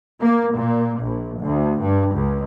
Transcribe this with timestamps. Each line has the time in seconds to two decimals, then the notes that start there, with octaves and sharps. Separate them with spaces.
0.21 A#3
0.54 A#2
1.02 A#1
1.41 D2
1.81 G2
2.14 C#2